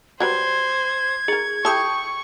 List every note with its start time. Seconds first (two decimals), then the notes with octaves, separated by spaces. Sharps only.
0.20 F#3 G3 B4 C5 G#6
1.28 D#4 G#4 A#4
1.65 E4 G4 A4 G5 C#6 D#6 G6